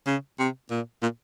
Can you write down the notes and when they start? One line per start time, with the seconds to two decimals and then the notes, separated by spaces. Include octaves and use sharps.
0.07 C#3
0.39 C3
0.71 A#2
1.02 A#2